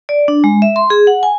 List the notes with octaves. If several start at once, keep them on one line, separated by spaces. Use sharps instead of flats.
D5
D4
G#3
E5
C6
G#4
F#5
G#5